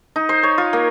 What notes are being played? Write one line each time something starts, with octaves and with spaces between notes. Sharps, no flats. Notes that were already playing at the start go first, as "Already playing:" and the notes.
D#4
C5
C#5
F4
A#3